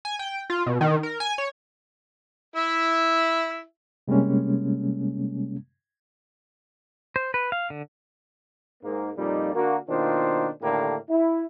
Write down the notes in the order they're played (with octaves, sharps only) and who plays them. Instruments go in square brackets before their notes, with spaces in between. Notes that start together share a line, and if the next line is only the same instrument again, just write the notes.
[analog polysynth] G#5
G5
F4
B2
D#3
A#4
G#5
C#5
[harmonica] E4 E5
[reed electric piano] C3 G3 G#3 A#3 C#4
[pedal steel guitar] C5
B4
F5
D3
[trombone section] G#2 A#3
F2 A#2 G3 A#3 D#4
D3 A#3 F#4
B2 D#3 A#3 D4 F4 C5
A2 D3 D#3 A#3 D4 G4
E4